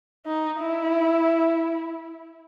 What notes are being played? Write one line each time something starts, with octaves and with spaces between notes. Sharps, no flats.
D#4
E4